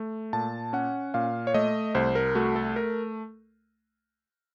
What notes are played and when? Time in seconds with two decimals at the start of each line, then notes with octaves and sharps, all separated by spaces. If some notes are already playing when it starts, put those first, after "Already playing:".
Already playing: A3
0.33 A#2 A5
0.73 C#4 F#5
1.14 A#2 F5
1.47 C#5
1.54 A3 D#5
1.95 C2 C5
2.15 A#4
2.35 A3 F#4
2.56 A4
2.76 A#4